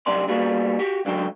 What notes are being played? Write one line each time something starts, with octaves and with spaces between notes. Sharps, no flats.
F#2 C3 G4 D5 C6
G3 A#3 B3 F#4 G#4
F#4 G4
C#2 D3 F#3 G5